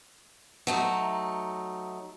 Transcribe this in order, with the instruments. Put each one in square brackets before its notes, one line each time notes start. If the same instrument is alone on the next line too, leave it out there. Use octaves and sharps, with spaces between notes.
[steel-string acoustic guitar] F#3 A3 D#4